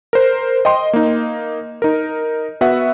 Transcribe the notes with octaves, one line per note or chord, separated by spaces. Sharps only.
A#4 C5
D#5 G5 C6
A#3 D#4
D#4 A#4
B3 F#4 B4 E5 F#5